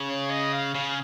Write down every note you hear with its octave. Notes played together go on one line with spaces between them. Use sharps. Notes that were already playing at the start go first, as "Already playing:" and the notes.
Already playing: C#3
C#5
D#5
F5
C#3 F5